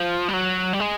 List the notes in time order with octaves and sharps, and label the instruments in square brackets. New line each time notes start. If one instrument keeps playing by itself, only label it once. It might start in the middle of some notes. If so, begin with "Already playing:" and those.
Already playing: [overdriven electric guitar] F3
G3
F#3
G3
G#3